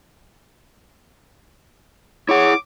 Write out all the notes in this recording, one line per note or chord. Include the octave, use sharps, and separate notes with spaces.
E4 G#4 C#5 F#5 D6